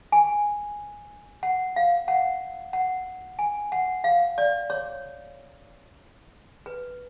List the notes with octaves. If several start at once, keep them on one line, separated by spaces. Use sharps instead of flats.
G#5
F#5
F5
F#5
F#5
G#5
F#5
F5
D5
C#5
B4